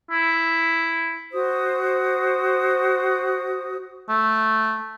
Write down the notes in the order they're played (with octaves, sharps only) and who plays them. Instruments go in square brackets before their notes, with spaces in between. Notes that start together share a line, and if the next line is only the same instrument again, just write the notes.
[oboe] E4
[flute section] F#4 C5 D#6
[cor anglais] A3